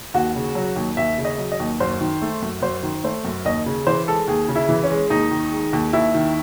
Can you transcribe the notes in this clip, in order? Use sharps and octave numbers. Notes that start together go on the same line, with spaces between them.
D#2 F#4
C#3
F#3
D#2
D#2 E5
C#3
D#5
F#3
D#5
D#2
F#2 C5
D#3
A3
F#2
F#2 C5
D#3
A3 C5
F#2
D#2 D#5
C#3
E3 C5
G#3 A4
D#2 G#4
C#3
E4
E3
C#4
G#3
D#2 D#4
D#3
G#3
D#2
D#2 E4
D#3